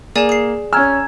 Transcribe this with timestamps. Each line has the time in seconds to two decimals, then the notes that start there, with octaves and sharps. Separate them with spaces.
0.16 A#3 G#4 D5 G#5 E7
0.29 G#4 C7
0.73 C#4 G#5 A#5 E6 F6 G#6